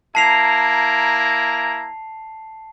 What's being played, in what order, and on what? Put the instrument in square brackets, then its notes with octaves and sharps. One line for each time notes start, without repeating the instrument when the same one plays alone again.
[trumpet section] A#3 E4 A#5 [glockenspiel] A5 C7 F7